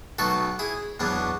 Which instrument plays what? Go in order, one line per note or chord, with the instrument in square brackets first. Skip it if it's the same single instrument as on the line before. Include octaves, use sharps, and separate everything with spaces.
[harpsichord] B1 B2 A3 F#4 A4
E4 G#4
E2 B2 F#3 B3 D4